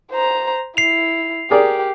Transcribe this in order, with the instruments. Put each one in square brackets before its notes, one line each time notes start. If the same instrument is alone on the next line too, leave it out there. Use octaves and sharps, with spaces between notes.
[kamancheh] C5 A#5
[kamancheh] E4 [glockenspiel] C7 F7
[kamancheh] G4 [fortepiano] G#4 A#4 D5